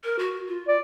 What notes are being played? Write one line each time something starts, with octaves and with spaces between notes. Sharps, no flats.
A#4
F#4
F4
D5